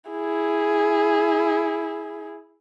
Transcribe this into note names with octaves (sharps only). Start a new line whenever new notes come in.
E4 G#4